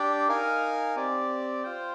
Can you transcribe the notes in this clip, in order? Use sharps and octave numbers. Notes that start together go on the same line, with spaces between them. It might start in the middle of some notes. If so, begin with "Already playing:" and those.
Already playing: D4 G4 D5 G5
D#4 A#4 F5 G#5
C4 G4 D5
F4 C5 G5